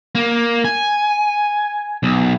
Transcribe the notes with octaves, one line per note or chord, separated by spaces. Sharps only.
A#3
G#5
B1